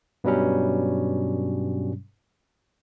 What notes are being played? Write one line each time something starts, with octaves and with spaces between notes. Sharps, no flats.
G2 B2 F#3 G3 C#4